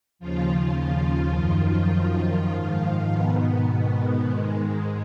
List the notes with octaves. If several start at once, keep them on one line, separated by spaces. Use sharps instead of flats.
D#2 C#3 F3 F4
F3 F4
F#2 D#3
G#2 D#3
B2 B3
G#2 D#3
G#2 G#3